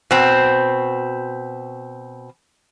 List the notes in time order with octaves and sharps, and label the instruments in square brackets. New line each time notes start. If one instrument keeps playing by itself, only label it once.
[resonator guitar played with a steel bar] B2 C4